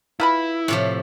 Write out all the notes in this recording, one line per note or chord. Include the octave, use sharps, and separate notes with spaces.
E4 F4 B4 B5
A2 C3 F3